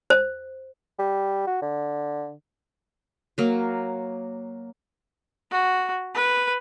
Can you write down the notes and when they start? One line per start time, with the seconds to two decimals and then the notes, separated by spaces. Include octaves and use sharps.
0.10 C5
0.99 G3
1.47 F#4
1.62 D3
3.38 F#3 A#3
5.51 F#4
6.14 B4